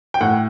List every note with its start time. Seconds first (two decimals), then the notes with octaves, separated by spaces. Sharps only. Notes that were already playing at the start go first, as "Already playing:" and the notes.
0.14 G5
0.21 A2 F#5